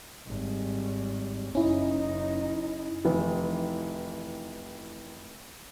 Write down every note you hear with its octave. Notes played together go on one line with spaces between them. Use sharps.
G#1 G3
F#1 C#4 D#4 E4
F1 D#3 E3